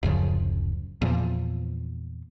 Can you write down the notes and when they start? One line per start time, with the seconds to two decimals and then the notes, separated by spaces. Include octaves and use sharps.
0.03 D1 F#2 C#3 F3
1.02 E2 A#2 F3